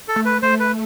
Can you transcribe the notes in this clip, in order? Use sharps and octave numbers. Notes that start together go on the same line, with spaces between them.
A4
A3
B4
A3 C5
B4